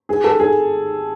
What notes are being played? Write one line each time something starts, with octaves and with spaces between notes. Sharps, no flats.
G#4
A4
G#4